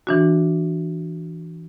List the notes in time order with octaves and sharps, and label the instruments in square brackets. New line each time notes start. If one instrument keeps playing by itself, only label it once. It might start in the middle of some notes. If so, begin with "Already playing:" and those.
[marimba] E3 D4 F#4